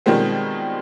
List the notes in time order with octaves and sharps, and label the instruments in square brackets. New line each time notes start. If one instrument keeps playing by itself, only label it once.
[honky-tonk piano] B2 D#3 F3 G3 G#3 C4